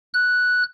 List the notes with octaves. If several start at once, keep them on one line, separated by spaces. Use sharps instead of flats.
F#6